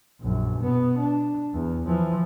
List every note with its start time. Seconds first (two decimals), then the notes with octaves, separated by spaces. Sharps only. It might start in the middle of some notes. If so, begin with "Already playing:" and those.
0.21 A#1 F#2
0.61 B2 B3
0.98 D4
1.54 E2
1.85 E3 F3